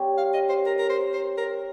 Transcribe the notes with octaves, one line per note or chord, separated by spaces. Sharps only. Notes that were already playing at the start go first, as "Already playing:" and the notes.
Already playing: G3 C4 G4 C#5
F5
D#5
C5
A#4
A#4
C5
C5
A#4